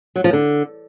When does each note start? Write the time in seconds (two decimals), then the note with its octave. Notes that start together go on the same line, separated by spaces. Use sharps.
0.16 F#3
0.24 F3
0.33 D3